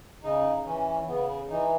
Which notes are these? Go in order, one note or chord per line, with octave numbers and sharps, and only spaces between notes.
C#3 D#4
E3 C#4
C#3 B3
E3 D#4